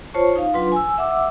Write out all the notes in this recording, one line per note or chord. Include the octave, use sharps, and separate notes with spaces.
F4 C5 C#5 A5 C#6
D#4 F5
F#3 D4 F4 B4 C6
G#5 E6
E5 F#5 D6 E6